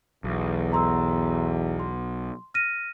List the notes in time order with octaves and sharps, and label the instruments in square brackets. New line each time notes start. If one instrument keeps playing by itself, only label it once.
[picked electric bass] B1 [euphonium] E2
[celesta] A#5 C6 E6
C6
F6 A#6 D#7